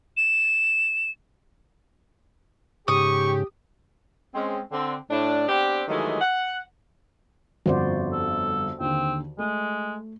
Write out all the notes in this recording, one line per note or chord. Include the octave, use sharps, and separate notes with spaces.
E7
G#2 C#3 G4 C#6 D#6
G#3 C4 C#4
D3 C4
A2 D4
B3 C4 D4 G4
G2 D#3 E3 F#3 G#3 A3
F#5
G1 F2 F#4 C5 D5
A4
D#2 D3 C4
G#3 A3